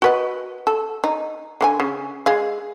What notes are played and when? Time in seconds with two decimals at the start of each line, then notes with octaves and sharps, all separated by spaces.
0.02 F#4 B4 D#5
0.67 A4
1.04 D#4
1.61 D3 E4 G#5
1.80 C#3
2.26 G#3 G#4 F5